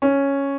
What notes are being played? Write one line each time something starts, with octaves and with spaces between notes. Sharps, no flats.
C#4